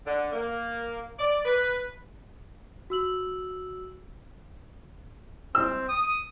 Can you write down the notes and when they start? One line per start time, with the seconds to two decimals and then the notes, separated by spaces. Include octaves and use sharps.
0.06 D3
0.32 A#3
1.19 D5
1.45 B4
2.90 F#4 E6 F#7
5.55 C4 E6
5.89 D#6